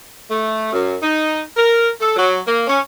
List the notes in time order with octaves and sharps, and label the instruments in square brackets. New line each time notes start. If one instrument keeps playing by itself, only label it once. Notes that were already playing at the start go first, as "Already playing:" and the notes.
[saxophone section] A3
F#2
D#4
A#4
A4
F#3
A#3
C#4